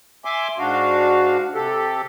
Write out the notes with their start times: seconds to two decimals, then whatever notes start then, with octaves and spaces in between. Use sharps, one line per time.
0.25 E5 G#5 C6 D6
0.59 G#2 D4 F#4 F5
1.55 C3 G4 A4